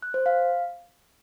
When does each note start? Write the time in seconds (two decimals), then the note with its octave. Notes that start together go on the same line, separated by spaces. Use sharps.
0.02 F#6
0.14 C5
0.26 F5